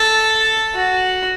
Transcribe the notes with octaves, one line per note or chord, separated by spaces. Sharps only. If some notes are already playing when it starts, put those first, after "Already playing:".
Already playing: A4
F#4